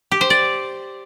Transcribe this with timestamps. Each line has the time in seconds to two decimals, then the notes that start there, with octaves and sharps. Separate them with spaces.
0.12 G4
0.21 C5
0.30 D5